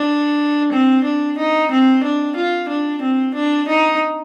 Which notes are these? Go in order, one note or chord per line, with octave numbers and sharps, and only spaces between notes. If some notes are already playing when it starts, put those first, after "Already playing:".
Already playing: D4
C4
D4
D#4
C4
D4
F4
D4
C4
D4
D#4